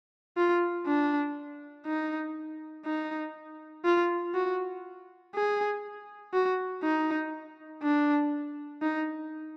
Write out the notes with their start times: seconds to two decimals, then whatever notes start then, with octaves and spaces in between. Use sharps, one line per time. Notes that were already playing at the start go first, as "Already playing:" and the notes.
0.37 F4
0.87 D4
1.86 D#4
2.85 D#4
3.85 F4
4.35 F#4
5.34 G#4
6.33 F#4
6.83 D#4
7.83 D4
8.82 D#4